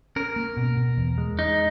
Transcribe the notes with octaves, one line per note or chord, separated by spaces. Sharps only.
C#4 A#4
A#3
B2
B2
E2
G#3
G#3 D#4